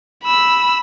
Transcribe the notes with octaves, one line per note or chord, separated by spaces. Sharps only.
B5 E6